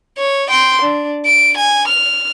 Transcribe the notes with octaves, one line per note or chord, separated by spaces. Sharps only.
C#5
G5 C6
D4
D7
G#5
F6